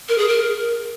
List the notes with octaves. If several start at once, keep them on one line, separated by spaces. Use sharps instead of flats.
A#4
G#4
A#4